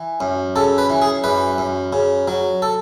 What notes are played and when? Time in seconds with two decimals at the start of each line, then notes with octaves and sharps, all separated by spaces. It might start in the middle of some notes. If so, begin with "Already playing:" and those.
Already playing: E3
0.21 F#2
0.56 C#3 A4
0.78 B4
0.90 E3
1.02 G#4
1.24 F#2 B4
1.58 F#2
1.93 C#3
2.28 F#3
2.62 A4